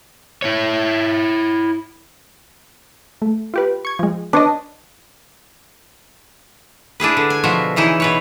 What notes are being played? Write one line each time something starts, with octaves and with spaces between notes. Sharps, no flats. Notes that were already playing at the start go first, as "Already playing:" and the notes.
E4 C#5
A3
F4 G4 B4
C#6 G#6
F3 G#3
D4 B4 C#5 D#5
D4 E4 G#4 B4
D3
G#5
B2 F3 F#4 E5
C#3 E3 D#4 E4
B2 B4 C#5